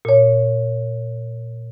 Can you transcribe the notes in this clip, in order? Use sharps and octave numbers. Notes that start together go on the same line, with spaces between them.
A#2 C#5